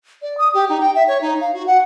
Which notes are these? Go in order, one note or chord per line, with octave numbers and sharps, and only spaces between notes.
D5
D#6
G4
D#4
G5
E5
C#5
D#4
F5
F#4
F#5